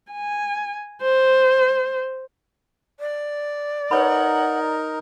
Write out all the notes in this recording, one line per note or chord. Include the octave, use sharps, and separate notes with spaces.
G#5
C5
D5
D#4 A#4 B4 C#5 F#5 B5